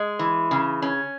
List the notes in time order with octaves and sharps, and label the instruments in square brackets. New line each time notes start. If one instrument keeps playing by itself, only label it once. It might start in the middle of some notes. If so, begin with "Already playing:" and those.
Already playing: [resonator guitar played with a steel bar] G#3
E3
C#3
C#4